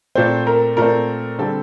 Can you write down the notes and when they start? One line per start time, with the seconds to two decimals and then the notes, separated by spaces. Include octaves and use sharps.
0.15 A#2 A3 C4 C5
0.47 A#4
0.77 A#2 A3 C4 A#4
1.39 D3 G3 C4 A4